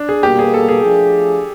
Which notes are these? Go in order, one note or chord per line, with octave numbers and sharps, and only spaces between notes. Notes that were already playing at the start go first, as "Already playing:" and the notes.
Already playing: D4
G#4
B2 G3 A#3 G4
G#4
A4
G#4
F3 A3 D4 F4 G#4